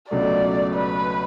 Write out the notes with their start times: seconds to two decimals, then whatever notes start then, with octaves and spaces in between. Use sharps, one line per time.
0.11 C#2 B2 F#3 A3 D5
0.74 B4